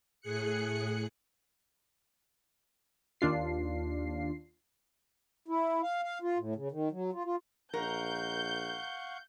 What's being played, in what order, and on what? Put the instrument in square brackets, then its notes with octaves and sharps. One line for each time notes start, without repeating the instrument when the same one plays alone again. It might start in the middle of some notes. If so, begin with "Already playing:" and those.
[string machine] A2 G#4 F#6 C#7
[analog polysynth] D#2 D4 F4 C7
[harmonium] E4
F5
F5
F4
A2
C#3
D#3
F#3
F4
F4
[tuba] A#1 [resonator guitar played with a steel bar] A#4 [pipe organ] F5 F#5 C#6 [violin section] G6